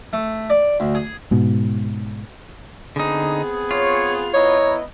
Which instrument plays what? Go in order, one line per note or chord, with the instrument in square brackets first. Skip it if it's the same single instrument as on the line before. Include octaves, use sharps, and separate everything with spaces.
[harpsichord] A3
D5
D2
G#4
[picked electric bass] G#2 B2
[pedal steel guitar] D3 D#4 [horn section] B3 C4 G#4
[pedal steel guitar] F4 [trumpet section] C#5
[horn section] B3 B4 D#5 [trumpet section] E4 A#5 [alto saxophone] C#5